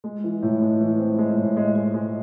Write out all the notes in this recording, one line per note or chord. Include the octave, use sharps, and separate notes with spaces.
G#3
E3
A2
G#3
E3
C4
G#3
A2
G#3
G#3
G#3